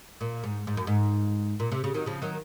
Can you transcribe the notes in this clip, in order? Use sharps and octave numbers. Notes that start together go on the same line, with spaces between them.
A#2
G#2
G#2
F#2
G#2
A#2
C3
C#3
D#3 F#3
C#3 F3
D#3 F#3